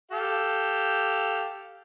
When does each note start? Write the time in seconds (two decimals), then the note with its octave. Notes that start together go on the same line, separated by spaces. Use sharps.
0.11 G4 A4 F5